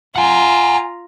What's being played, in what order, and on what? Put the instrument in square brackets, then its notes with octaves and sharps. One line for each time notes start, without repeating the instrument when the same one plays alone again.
[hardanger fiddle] F4 A#5 [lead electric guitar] F#5 G#5